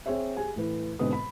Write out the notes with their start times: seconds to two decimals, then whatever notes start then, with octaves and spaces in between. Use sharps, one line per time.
0.06 C4 G#4 C5 C#5 E5
0.37 G4 G#4 G#5
0.56 A2 E3 B4
0.99 G#2 B2 D3 C4 B4 D#6
1.13 B5